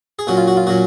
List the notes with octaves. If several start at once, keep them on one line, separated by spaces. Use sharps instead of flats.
G#4
A#2 F#3 C#4 F#4
F4
F#4
F4
A#2 F#3 C#4 F#4